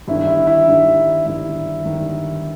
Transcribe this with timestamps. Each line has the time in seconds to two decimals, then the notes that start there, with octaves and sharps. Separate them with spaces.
0.08 G1 G2 D#3 E4
0.27 E4
0.47 E4
0.68 G1 G2 D#3
1.26 G1 G2 D#3 E4
1.85 G1 G2 D#3